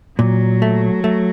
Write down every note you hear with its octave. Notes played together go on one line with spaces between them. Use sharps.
A#2 F#3
A3
A3